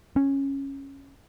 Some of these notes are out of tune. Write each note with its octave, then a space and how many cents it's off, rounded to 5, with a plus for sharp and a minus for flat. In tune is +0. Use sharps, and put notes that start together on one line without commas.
C#4 -10